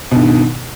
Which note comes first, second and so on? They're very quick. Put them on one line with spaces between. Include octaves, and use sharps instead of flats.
B2 G2 D#3